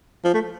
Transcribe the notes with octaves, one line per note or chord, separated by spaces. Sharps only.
F3
A3